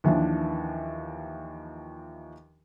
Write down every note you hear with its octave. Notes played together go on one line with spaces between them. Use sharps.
D#2 E3 F3 D4